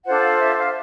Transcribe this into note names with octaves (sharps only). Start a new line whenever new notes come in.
D4 F4 A4 C5 F#5
F5
E5
F5